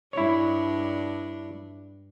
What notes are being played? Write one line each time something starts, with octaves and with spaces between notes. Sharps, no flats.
G2 D4 E4 C#5